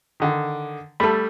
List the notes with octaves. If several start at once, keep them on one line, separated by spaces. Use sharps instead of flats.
D3 D#3
G3 A3 A4 B5